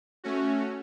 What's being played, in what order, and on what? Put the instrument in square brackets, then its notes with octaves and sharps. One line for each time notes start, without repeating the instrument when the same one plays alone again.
[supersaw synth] A3 C#4 F#4